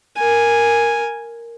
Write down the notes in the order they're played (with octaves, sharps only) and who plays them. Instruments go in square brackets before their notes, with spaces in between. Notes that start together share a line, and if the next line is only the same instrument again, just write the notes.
[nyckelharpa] A#4 G#5